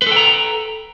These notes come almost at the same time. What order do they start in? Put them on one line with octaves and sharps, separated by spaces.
B4 A4 G5 A#5